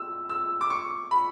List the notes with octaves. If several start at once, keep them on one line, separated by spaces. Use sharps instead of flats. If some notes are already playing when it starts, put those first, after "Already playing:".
Already playing: E6
E6
D6
C#6
B5